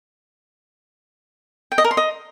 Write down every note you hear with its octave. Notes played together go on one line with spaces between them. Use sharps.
G5
D#5
A#4
C6
D#5